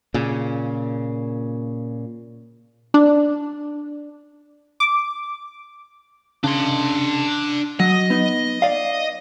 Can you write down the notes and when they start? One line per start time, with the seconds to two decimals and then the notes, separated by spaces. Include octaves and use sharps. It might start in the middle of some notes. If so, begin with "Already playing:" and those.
0.14 A#2 C#3
2.94 D4
4.80 D6
6.44 C#3 D4 C6
7.80 F#3 D#5
8.10 B3 D#4
8.62 D5 F5